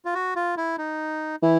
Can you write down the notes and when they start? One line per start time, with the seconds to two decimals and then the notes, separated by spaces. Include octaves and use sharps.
0.05 F4
0.15 F#4
0.36 F4
0.57 E4
0.78 D#4
1.42 E3 E4